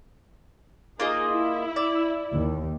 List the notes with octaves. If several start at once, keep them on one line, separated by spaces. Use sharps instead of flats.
A#3 D#4 F4 G#4 D#5
E4
D5
D#2